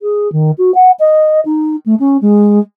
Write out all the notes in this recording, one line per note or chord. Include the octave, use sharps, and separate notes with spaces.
G#4
D#3
F#4
F#5
D#5
D#4
A3
C#4
G#3